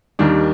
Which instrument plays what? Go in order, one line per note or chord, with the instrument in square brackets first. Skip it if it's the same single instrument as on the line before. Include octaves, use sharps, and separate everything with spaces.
[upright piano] D#2 D#3 G3 D4